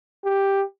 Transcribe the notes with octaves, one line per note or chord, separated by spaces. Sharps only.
G4